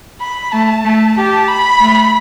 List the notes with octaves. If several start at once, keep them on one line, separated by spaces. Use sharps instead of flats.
B5
A3 A5
A3
G4 A5
B5
A3